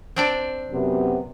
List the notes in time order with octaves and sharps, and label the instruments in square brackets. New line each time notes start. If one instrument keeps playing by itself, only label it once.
[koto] C4 D4 D5
[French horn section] F#2 C3 B3